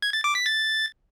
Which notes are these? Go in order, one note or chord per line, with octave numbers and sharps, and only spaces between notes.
G#6
A6
D6
B6
A6